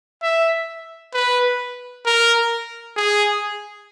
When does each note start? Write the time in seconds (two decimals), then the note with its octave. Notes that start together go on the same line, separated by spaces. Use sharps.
0.22 E5
1.14 B4
2.06 A#4
2.96 G#4